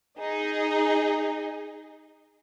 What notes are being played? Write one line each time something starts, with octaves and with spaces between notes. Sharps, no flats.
D#4 G#4 D#5